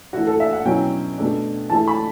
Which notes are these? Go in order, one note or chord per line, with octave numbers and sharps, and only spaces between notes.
E3 A3 E4 F#4
A4
E5
F#5
B2 F#3 C#4 E4 G5
B2 A3 D4
E3 A3 E4 A5
B5